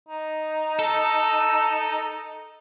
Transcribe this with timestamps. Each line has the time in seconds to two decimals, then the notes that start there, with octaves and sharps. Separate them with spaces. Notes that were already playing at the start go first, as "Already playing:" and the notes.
0.09 D#4
0.79 A4